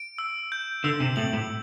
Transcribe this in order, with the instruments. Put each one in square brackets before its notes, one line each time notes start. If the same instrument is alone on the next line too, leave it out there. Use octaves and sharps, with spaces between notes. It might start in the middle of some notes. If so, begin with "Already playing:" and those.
Already playing: [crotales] D7
E6
G6
[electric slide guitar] D3 [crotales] E6
[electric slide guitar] C3
[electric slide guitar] A2 [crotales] F#7
[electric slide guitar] A2